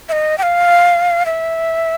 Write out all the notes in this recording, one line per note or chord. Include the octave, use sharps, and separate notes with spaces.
E5
D#5
G5
F5
E5